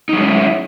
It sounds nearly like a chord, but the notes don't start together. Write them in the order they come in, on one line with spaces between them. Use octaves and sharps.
D#4 F#3 G#3 C#4 E4